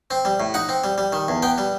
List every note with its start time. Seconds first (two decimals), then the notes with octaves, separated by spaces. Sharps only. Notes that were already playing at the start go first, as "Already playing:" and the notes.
0.11 C4
0.25 G3
0.40 A2
0.54 D#4 F#5
0.69 C4
0.84 G3
0.98 G3
1.13 D#3
1.28 E2
1.42 B3 G5
1.58 G3